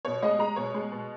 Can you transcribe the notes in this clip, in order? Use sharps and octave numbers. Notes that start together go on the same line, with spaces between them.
B2 C#5
G#3 D#5
G#3 A#5
B2 C#5
G#3
B2